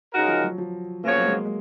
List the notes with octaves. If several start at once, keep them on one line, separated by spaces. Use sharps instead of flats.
C#3 G#3 D#4 F#4 A#4
F3
F#3
F3
C#3 F3 A#3 B3 F#4 C#5
F#3
G#3
G#3